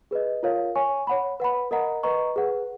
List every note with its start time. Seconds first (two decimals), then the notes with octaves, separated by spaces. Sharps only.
0.11 G#4 B4 D#5
0.43 F4 A#4 C#5 F5
0.75 C#5 G#5 C#6
1.07 C#5 F#5 B5
1.40 B4 F#5 B5
1.71 A#4 D#5 F#5 A#5
2.03 B4 D#5 A#5 C#6
2.36 G#4 B4 F#5